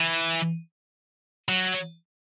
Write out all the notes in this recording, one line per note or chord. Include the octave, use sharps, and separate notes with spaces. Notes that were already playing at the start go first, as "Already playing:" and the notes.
Already playing: E3
F#3